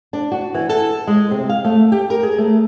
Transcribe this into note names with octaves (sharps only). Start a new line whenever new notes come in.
D4
F#4
E3
A4
G#3
C3
F5
A3
G4
A#4
G#4
A3